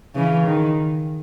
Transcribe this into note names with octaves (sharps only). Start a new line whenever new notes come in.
C#3 E3
D#3